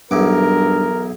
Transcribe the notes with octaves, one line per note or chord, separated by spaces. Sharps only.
B1 E2 G2 B3 A#4 D6